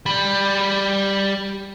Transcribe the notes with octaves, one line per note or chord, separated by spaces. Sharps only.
G3 B5